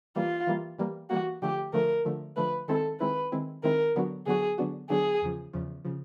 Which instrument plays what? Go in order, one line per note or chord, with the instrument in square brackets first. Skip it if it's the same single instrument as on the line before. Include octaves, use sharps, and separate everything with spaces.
[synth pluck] E3 G3 A#3 [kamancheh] F4
[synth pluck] E3 G3 A#3
E3 G3 A#3
[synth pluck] E3 G3 A#3 [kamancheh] F#4
[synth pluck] D3 F3 A3 [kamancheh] G4
[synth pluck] D3 F3 A3 [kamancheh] A#4
[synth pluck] D3 F3 A3
[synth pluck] D3 F3 A3 [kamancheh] B4
[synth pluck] D#3 G#3 C4 E4 [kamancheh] A4
[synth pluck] D#3 G#3 C4 E4 [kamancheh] B4
[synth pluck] D#3 G#3 C4 E4
[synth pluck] D#3 G#3 C4 E4 [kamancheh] A#4
[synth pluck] D3 F#3 B3 D4 F#4
[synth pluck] D3 F#3 B3 D4 F#4 [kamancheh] G#4
[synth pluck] D3 F#3 B3 D4 F#4
[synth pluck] D3 F#3 B3 D4 F#4 [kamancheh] G#4
[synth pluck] E2 C#3 F3
E2 C#3 F3
C#3 F3